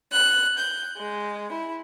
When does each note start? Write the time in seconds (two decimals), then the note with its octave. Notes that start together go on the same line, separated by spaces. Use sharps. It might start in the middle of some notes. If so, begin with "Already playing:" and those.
0.12 F#6
0.58 G6
0.97 G#3
1.52 E4